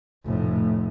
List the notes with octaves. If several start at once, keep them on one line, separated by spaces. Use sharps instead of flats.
F1 A2